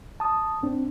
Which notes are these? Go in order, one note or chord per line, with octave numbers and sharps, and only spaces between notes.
A5 D#6
G#2 C4 D4